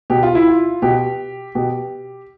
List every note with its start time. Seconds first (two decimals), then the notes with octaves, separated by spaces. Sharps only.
0.10 B2 G4
0.23 F4
0.35 E4
0.48 F4
0.82 B2 G4
1.55 B2 G4